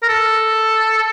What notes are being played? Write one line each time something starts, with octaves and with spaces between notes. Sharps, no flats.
A#4
A4